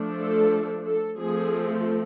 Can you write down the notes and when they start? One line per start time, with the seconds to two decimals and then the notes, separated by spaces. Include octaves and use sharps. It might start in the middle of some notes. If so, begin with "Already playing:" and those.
Already playing: F3 A3 D4
0.20 A4
0.85 A4
1.18 F3 A3 C4 G#4